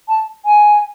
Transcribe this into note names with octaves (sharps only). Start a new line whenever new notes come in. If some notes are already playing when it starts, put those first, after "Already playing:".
A5
G#5